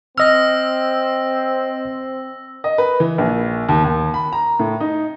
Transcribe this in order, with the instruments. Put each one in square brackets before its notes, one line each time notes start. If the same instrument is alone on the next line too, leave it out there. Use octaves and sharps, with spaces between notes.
[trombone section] C4 [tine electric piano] D#5 F6 [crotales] E6 A#6
[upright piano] D#5
B4
E3
A#1
D#2
D#2
B5
A#5
A2
D#4